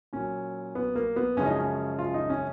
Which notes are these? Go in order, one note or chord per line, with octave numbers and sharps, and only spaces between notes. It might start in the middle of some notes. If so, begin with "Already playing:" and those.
A#2 F#3 C#4
B3
A#3
B3
F#2 C#3 F3 G#3 C#4
D#4
C#4
F4
D#4
C#4